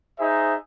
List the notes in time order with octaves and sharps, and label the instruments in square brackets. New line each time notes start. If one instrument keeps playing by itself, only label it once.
[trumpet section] D#4 G#4 C5 E5